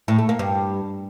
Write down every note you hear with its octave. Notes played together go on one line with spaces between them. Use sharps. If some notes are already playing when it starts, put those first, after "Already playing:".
A2
A3
A#3
G2